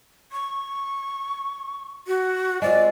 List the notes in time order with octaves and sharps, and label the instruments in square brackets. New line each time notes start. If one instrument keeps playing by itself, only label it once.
[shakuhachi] C#6
F#4
[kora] G#3 C4 F4 [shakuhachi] D5